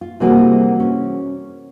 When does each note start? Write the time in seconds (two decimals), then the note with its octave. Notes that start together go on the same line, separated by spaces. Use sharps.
0.01 F4
0.20 C3 E3 G3 A#3 F#4 G#4
0.80 C#4